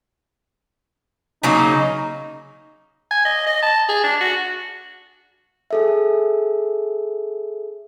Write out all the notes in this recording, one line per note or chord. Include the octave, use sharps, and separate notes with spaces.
C#3 F#3 A#3 D#4
G#5
D#5
D#5
A5
G#4
D4
F#4
G#4 A4 E5